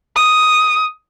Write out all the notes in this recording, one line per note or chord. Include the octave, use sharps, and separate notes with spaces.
D#6